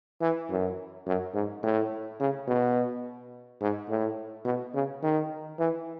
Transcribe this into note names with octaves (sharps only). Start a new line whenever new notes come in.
E3
F#2
F#2
G#2
A2
C#3
B2
G#2
A2
B2
C#3
D#3
E3